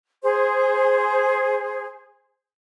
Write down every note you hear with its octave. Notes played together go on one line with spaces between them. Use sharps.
G#4 C5